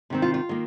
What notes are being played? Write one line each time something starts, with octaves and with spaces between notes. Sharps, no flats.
C3 D#3 C4
F4
F4
D#3 A#3